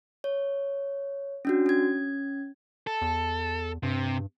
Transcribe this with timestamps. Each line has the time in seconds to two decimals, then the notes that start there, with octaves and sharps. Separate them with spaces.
0.24 C#5
1.45 C#4 D4 F#4
1.66 C#4 G#6
2.87 A4
3.02 E2
3.83 G2 C3